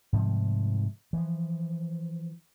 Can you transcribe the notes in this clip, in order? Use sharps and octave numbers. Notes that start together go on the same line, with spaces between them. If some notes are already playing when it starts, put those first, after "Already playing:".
G#2 C3 F3 G3
E3 F3